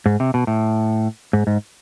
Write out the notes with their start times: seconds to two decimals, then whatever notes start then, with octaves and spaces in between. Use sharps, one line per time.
0.06 G#2
0.20 C3
0.34 B2
0.47 A2
1.33 G#2
1.47 G#2